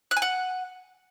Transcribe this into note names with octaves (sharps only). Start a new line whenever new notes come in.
F#6
G#5
F#5